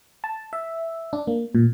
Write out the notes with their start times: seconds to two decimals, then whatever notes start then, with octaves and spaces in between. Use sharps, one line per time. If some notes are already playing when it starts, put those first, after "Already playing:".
0.24 A5
0.53 E5
1.13 D4
1.27 A#3
1.55 A#2